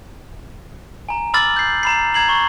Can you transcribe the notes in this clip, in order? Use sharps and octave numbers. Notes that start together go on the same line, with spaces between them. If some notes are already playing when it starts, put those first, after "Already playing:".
G#5 A#5
B5 D6 E6 F6 A6 F#7
G6 C7
A#5 B5 C7
A#5 G#6 C7 F#7
C#6